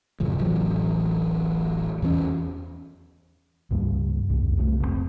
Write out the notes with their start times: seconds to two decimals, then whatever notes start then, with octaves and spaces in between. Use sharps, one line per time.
0.20 A1 F#2 C#3 F3
0.38 D1 A1 E3 F#3
2.02 E2 E3 C4 C#4
3.71 C#2 G2 G3 A#3
4.30 C2 F2
4.57 C2 C3 F#3 A3
4.81 F1 C3 C4